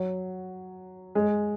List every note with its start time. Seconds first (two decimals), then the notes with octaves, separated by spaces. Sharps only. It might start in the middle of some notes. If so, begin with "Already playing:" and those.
Already playing: F#3
1.15 G#3